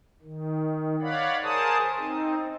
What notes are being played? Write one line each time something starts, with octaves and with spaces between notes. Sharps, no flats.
D#3
C#5 D5 F5 F#5 B5
G#4 A#4 C5 A5 D#6
C4 D#4